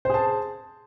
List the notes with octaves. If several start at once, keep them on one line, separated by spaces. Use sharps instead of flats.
G#4 C5 A5